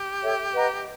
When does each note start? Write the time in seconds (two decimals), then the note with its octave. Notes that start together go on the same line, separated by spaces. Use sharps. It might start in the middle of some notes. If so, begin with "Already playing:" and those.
Already playing: G4
0.23 A4 C#5 E5 G5
0.55 B4 D#5 F#5 A#5